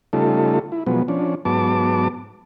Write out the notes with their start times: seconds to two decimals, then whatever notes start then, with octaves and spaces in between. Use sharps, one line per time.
0.13 C#3 G3 A3 D#4 F4 A4
0.72 E4
0.87 B2 F3 F#3 G#3 B3
1.08 F3 C#4 D4
1.45 G#2 F#3 B3 A5 D6